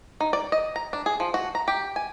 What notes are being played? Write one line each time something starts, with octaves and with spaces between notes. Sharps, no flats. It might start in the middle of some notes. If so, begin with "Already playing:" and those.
D#4
D5
D#5
A#5
D4
G#4
F3
F#4
A#5
G4
G#5